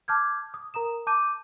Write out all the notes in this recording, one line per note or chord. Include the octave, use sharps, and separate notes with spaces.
A5 D6 F6 G6 G#6
D#6
A#4 A#5 D#6 E7
A5 D6 G6 D#7